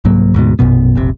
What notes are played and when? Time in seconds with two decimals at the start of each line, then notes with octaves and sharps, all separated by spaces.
0.05 C2 G#2 F#3 A#3
0.34 D2 G#2 B2
0.59 A#1 F#2 B2 B3
0.96 F1 A#1 C3